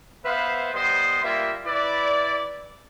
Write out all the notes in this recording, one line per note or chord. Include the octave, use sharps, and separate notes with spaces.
B3 B4 C5 E5 F5
G3 B3 C5 D#5 C6
G3 A#3 F4 E5
E4 B4 D5